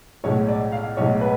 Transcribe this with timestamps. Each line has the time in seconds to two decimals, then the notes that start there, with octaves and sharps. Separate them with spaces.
0.24 B1 A2 G#3 C#5
0.48 D5
0.72 F5
0.97 B1 A2 G#3 C#5
1.21 B4